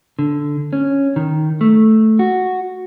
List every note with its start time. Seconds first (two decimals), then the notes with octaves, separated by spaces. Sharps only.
0.19 D3
0.73 C#4
1.16 D#3
1.61 A3
2.19 F#4